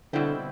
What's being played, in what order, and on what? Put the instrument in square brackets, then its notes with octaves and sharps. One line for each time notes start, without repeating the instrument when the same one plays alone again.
[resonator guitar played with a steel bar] B2 G3 C4 E4 [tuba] D3